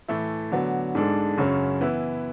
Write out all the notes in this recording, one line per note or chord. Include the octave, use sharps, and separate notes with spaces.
A2 E3 A3 E4
D3 F#3 B3
G#2 G#3 D4 A4
F#2 C#3 F#3 C#4
E3 B3 E4 B4